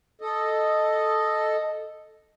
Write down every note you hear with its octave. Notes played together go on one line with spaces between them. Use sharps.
A4 D#5